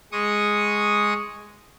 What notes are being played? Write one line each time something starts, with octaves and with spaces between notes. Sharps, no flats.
G#3 C#6 D#6